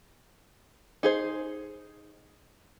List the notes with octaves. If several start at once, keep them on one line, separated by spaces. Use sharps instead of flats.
D#4 G#4 C5